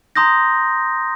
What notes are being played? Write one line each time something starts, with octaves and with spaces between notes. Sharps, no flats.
A#5 C6 D#6 G6 A#6